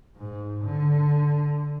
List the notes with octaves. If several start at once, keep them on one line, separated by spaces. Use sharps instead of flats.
G#2
D3